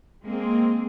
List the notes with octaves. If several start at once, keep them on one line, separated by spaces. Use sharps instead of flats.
G#3 A#3 C4 G#4